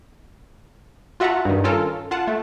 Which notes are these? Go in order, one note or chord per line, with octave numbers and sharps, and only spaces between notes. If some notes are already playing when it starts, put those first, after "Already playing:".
F4 F#4 E5 F#5 A5 A#5
G2 D#3
C#4 F4 A4 A#4
F4 F#5 A5
A3